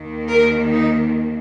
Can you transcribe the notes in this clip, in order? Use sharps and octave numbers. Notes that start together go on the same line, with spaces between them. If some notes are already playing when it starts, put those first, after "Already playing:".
Already playing: D#2 D#3 A#3
A#4
D#4